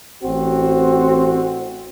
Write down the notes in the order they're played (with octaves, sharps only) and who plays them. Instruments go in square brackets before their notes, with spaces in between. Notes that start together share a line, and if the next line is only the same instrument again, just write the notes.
[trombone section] A1 C4 F#4